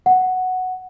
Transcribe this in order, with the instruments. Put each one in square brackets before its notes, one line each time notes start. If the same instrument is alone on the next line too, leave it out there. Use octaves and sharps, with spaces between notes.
[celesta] F#5